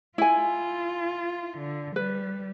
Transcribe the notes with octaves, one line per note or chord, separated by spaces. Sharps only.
E4 F4 G#5
D3
G3 B4